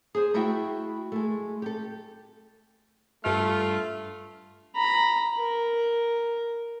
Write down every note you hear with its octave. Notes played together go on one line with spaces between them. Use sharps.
G#4 C5
A3 E4 F#4 E5 G5
G#3 A3
G4 A4
G2 A3 F4 F6
A#5 B5
A#4